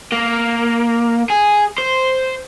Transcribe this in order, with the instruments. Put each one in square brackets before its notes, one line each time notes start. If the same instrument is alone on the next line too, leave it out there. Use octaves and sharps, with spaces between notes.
[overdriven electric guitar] A#3
G#4
C5